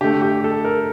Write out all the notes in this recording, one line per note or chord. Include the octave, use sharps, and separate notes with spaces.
D3 A3 G4
G4
A4
A#4